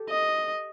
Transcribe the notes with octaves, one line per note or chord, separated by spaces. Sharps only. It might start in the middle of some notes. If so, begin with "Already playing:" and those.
Already playing: G4 A4
D#5